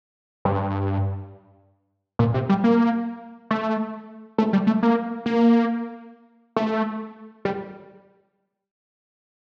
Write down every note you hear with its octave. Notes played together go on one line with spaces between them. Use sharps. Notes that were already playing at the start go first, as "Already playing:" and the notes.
G2
A#2
C3
G3
A#3
A3
A3
G3
A3
A#3
A#3
A3
G3